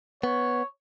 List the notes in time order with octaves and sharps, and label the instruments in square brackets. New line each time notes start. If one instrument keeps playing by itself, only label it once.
[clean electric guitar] B3 [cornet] C#5